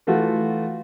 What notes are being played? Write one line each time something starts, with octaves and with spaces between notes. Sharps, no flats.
E3 A3 F4 F#4